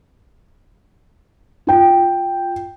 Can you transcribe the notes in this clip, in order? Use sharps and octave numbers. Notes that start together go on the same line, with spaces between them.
F4 G5